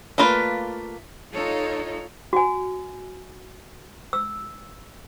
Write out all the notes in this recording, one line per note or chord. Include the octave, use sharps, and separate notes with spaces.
A3 A#3 F4 B4 D5
D#4 F4 A4 C#5
F#4 G#5
E6